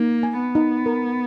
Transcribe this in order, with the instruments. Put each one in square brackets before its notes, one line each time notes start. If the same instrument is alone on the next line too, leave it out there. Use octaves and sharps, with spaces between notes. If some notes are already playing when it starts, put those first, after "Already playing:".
Already playing: [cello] A#3 [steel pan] D#4
[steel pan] G#5
[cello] B3
[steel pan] D#4
A#4